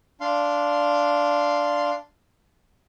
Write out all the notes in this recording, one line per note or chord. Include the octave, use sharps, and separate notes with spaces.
D4 F5 C6